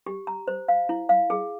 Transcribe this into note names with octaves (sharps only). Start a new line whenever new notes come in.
G4
A#5
C5
F5
E4
F5
G#4